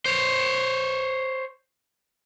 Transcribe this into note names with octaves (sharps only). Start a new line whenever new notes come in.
C5 C#5